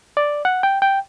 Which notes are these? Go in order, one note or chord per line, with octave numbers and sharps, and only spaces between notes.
D5
F#5
G5
G5